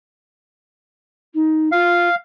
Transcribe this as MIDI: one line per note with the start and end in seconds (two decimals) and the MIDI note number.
1.34 1.71 63
1.72 2.08 65
1.72 2.15 77